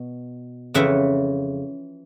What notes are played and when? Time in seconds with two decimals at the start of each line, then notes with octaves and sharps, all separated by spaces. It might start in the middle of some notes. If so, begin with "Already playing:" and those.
Already playing: B2
0.74 F2 C#3 E3 E5 F#5